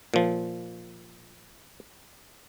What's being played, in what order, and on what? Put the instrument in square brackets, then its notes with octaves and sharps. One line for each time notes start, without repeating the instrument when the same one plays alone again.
[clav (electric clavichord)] A#2 F3